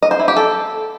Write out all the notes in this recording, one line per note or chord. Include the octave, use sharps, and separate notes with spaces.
D#5
C5
E4
G4
A4